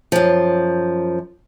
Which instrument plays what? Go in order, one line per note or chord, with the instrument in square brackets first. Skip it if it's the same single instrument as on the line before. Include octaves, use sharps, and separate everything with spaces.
[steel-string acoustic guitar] F#2 F3